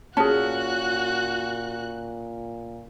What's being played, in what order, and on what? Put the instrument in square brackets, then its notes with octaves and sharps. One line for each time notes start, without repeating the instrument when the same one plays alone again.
[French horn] A#2 [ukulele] C#4 [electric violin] F#4 F#6 [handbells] G#4 A5